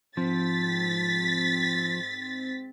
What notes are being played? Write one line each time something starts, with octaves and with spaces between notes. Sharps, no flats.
G#2 F3 C4 A6 B6